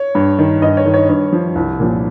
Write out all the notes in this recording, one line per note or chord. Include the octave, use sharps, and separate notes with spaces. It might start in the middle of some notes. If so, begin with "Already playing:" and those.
Already playing: C#5
G2
D#3
G2 D#5
C#5
D#3
C#5
G2 C#5
F3
C2
A#2 F3